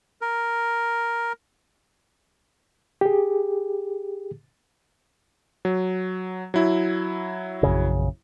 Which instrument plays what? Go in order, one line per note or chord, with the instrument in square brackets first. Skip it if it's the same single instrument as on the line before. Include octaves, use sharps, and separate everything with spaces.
[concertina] A#4
[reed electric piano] G4 G#4
[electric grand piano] F#3
F#3 E4
[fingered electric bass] A#1 F#2 C#3